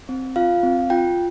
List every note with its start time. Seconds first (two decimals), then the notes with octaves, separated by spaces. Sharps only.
0.09 C4
0.36 F4 F5
0.63 C4
0.90 F4 G5